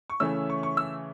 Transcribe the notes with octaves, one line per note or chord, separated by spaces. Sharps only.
C#6
C#3 E3 A3 C#4 E6
C#6
C#6
E6